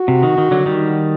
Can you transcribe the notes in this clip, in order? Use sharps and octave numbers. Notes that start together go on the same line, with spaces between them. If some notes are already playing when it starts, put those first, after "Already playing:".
Already playing: F#4
C3
D#3
D#3
D3 F#3
D#3 G3